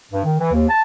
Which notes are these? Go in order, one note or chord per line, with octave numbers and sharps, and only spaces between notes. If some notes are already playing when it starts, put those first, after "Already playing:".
G2
D#3
E3
D#2
A5